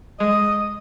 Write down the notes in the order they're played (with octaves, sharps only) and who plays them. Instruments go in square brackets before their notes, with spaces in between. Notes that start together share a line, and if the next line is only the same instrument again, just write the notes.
[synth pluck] G#3 [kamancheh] D#5